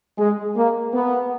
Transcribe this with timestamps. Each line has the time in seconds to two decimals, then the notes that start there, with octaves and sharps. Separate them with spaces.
0.18 G#3
0.57 A#3
0.94 B3